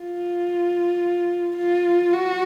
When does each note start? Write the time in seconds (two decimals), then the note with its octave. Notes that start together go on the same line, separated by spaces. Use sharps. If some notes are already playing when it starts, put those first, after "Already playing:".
Already playing: F4
1.56 F4
2.13 F#4